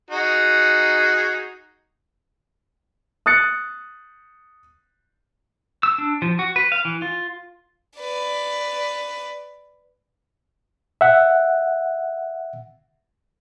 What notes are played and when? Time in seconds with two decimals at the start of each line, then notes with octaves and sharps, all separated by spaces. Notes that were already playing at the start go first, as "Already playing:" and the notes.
0.11 D#4 F#4 G#4
3.26 D#6 F#6 A6 C#7
5.83 E6
5.98 D4
6.22 F3
6.39 F#4
6.56 B4
6.72 F5
6.85 E3
7.02 F4
7.98 B4 D5
11.01 E5 F#5